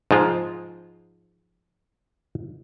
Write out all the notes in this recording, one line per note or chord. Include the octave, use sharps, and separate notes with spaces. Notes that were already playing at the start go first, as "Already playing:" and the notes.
G#2 F3 G#3 F4